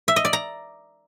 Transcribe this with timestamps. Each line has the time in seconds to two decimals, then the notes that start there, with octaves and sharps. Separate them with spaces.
0.08 E5
0.16 D#5
0.25 D5
0.33 A#5